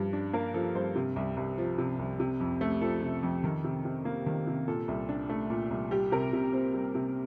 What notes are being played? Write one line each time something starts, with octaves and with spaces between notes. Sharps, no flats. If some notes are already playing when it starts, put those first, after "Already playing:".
Already playing: G2 F3
D4
A#3 A#4
F3 A4
G2 C5
C3
C2
C2
F3
C3
C2
C3
F2
A3
F3 A4
C3
F2
D#3
C3
C3
A#3
D#3
C3
A#2 A4
C2
D4
A3
A#2
C2
G3 G4
C3 A#4
C3
C4
G3
C3